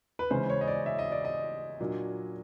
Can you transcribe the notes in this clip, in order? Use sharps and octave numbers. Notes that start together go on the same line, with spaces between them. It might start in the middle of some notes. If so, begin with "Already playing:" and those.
B4
C#3 E3 G#3 C#4 C5
C#5
D#5
D5
E5
D#5
D5
D#5
A#2 F#3 A#3 D4